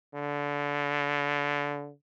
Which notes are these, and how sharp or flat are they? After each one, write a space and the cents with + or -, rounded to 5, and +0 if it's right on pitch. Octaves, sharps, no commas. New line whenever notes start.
D3 -25